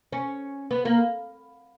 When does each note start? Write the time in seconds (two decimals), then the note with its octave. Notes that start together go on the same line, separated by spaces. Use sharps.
0.12 C#4
0.71 B3
0.85 A#3